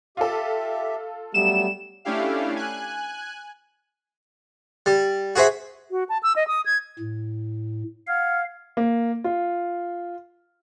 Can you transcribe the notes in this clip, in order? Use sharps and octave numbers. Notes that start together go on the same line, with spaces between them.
F4 G4 A4 E5
F#3 G3 A3 B3 E7
A3 C#4 D4 E4 G4 F5
G#5 F#6
G3
F#4 G#4 C5 E5
F#4
A5
E6
D#5
D#6
G#6
A2
F5 F#5 F6 G#6
A#3
F4